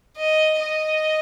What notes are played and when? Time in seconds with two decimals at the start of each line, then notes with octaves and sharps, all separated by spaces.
0.17 D#5
0.59 D#5